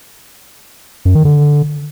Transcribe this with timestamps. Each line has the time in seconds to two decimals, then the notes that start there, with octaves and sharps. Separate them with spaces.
1.05 F#2
1.15 D#3
1.25 D3